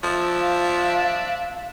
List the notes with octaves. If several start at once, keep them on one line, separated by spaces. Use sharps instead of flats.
F3 D4 E5
F5